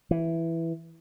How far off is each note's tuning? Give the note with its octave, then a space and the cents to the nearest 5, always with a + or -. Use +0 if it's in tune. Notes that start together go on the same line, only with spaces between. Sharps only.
E3 +5